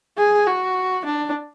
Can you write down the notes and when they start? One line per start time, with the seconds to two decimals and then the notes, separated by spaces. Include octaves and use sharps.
0.18 G#4
0.47 F#4
1.05 D4